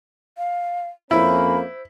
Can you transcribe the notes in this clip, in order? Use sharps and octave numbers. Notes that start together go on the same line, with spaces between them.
F5
F2 A#3 C#4 E4 C5 B5